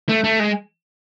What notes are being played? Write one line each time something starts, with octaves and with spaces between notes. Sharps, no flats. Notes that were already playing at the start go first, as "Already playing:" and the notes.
A3
A3
G#3